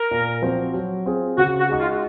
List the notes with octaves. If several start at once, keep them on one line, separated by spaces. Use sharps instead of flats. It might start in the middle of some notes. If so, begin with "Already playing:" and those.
Already playing: A#4
A#2
F3 C4 F#4 C5
F#3
C4 F4 G#4
C#3 F#4
F#4
G#3 D#4 F#4
F4